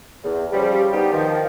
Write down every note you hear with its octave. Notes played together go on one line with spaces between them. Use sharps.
E2
C#3 F3 G3
G3 B3 D4 D#4 G4
D#3 F3